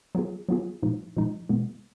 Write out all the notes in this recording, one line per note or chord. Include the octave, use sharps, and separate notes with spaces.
F#3 B3 F4 G#4
F#3 B3 F4 G#4
A#2 F3 G#3 D#4
A#2 F3 G#3 D#4
B2 G#3 B3